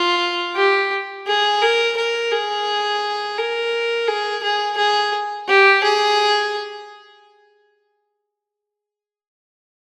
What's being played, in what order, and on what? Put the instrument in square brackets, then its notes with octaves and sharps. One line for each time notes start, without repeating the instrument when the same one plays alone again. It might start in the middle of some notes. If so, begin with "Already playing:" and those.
Already playing: [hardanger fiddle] F4
G4
G#4
A#4
A#4
G#4
A#4
G#4
G#4
G#4
G4
G#4